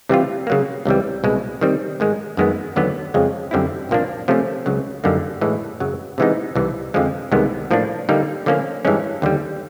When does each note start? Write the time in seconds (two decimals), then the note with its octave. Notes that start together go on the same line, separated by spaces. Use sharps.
0.09 C3 E3 G3 C4 F4
0.47 C#3 F#3 A#3
0.85 C#2 C3 E3 G3
1.24 C2 B2 G#3
1.61 D#3 G3 C4
2.00 G#2 D#3 G#3
2.37 F#2 D#3 G#3 B3
2.76 D#2 D3 F#3 B3
3.14 F2 C#3 F3 G#3
3.51 F#2 D3 G3 C4 E4
3.89 C2 A#2 F3 A#3 D4
4.28 C3 F3 A3 C#4
4.66 C#2 C#3 F#3
5.04 F#2 D3 G3 A#3 D#4
5.41 A2 E3 G#3
5.80 F#2 C#3 F#3
6.18 C3 E3 G#3 B3 D#4
6.55 C2 C3 E3
6.94 F2 D3 F3 G#3
7.32 C2 C3 D#3 G#3 B3
7.71 A2 F3 A#3 D4
8.09 D3 G3 A#3 D#4
8.46 D3 F3 A#3 C#4
8.85 G2 E3 G#3 C#4
9.22 D#2 D3 G3